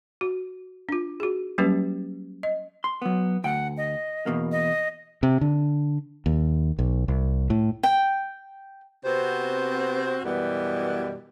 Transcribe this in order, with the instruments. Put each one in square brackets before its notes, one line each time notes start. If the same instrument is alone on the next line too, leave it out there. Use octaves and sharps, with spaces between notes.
[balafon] F#4
D4 F4
F#4 G#4
F#3 G3 A#3 C#4 G4 B4
D#5
[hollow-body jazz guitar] C6
F#3 B3
[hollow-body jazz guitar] D2 G5 [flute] F#5
[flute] D#5
[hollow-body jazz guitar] E2 B2 A#3
[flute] D#5
[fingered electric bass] C3
D3
D#2
B1
C2
A2
[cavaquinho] G5
[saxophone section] C3 B3 C4 F#4 C5
F#2 B2 E3 G3 B3